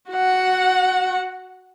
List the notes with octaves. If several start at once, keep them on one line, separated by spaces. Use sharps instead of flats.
F#4 F#5